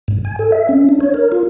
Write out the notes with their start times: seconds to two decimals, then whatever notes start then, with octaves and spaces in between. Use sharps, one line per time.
0.08 G#2
0.25 G#5
0.39 A4
0.52 E5
0.69 C#4
0.89 D4
1.00 C#5
1.14 A#4
1.32 F4